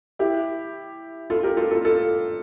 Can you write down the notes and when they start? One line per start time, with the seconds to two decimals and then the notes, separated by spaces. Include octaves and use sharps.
0.19 E4 G4
1.30 F4 A4
1.43 G4 A#4
1.57 F4 A4
1.71 F4 A4
1.85 F4 A4